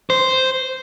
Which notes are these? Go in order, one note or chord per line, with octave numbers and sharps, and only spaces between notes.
C5